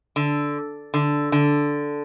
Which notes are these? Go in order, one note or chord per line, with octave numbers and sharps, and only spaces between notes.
D3
D3
D3